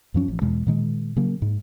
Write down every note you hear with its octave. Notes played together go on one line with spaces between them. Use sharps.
F#2 F3 C#4
A1
E2 B2 G#3
A#2 D#3 G#3
C#3 F#3 A#3
G#2